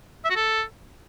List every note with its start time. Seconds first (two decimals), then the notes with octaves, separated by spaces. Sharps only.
0.25 E5
0.30 F#4
0.36 A4